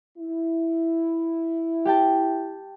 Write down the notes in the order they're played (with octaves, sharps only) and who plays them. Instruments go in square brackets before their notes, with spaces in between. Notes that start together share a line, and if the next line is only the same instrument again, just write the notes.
[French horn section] E4
[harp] G4 G5 A5